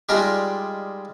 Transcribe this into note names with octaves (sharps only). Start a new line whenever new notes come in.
G3 G#3 D4 D#4 F4 G4